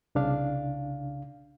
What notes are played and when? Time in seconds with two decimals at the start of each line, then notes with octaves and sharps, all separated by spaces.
0.15 C2 C#3 D4 F5